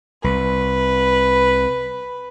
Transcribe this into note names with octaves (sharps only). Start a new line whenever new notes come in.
C2 B4